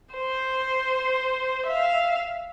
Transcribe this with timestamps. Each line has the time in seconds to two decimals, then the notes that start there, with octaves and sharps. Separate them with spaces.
0.14 C5
1.67 E5 F5